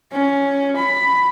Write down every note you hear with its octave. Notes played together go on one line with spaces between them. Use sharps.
C#4
B5